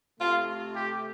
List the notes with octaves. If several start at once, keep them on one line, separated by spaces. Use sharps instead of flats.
C3 A3 F4
G4